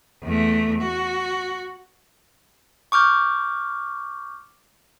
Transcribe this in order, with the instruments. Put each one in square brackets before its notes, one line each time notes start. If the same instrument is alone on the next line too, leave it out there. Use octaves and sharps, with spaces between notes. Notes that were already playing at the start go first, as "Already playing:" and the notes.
[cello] E2 A3
F#4
[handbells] C#6 D6 F6 G6